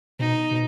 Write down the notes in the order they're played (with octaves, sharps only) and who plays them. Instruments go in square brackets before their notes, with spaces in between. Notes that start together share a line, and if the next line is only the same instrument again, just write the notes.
[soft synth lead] B2 [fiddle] D#4
[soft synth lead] B2